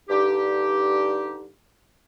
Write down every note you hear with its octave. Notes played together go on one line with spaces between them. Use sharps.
G2 D3 D#4 G4